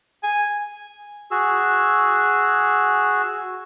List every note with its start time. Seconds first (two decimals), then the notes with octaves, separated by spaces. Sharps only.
0.23 G#5
1.31 F#4 G#4 E6